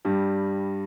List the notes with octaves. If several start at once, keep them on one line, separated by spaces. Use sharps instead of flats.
G2 G3